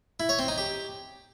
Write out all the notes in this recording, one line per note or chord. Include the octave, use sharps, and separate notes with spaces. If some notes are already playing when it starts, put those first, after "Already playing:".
E4
C#5
C4
D#4
G4